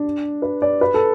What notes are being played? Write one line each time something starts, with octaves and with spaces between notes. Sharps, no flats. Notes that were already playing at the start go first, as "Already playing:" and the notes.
Already playing: D4
B4
D5
B4
A4